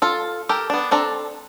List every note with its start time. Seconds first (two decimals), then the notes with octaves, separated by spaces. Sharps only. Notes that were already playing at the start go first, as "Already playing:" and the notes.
0.02 F4 A4
0.49 G4 A4 A#4
0.70 B3 D4
0.91 C4 D4 A4 A#5